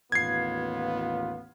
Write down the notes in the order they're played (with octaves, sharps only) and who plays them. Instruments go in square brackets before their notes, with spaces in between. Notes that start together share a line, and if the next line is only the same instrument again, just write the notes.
[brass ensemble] A1 D#2 F4 [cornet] B3 [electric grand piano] G#6 C7